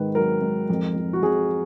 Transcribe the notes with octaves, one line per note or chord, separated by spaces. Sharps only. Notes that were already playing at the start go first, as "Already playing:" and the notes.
Already playing: G#2 D#3 B4
F#3 A#4
G#2
F2
F2
F#4
F2 G#4